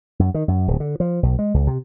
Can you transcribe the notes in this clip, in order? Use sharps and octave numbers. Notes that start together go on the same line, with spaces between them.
F#2
D#3
F#2
D1
D3
F3
B1
G#3
C#2
C3